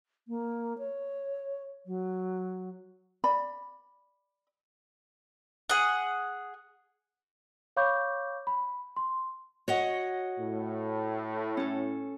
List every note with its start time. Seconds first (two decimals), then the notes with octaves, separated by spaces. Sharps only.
0.28 A#3
0.78 C#5
1.86 F#3
3.24 D5 B5
5.69 G#4 F#5
7.77 C#5 F5 B5 C#6 D6 G6
8.47 B5
8.96 C6
9.68 F#4 C#5 D#5 F#5
10.39 A2
11.57 C#4 A4